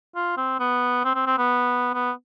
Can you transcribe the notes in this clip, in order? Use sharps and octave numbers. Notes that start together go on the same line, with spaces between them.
F4
C4
B3
C4
C4
C4
B3
B3